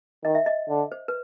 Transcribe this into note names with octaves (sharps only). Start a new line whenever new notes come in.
D#3 D#5
E5
D#5
D3
C5
B4